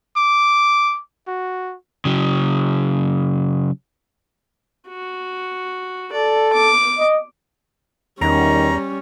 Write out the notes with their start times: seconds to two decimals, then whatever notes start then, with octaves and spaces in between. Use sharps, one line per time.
0.17 D6
1.28 F#4
2.05 C#3 F#3
4.89 F#4
6.12 A4 D5
6.53 D6
6.98 D#5
8.21 E2 D#3 G3 C#4 A#5